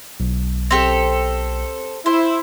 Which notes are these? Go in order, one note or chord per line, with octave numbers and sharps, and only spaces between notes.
B1
C4 G4 A4
E4 C5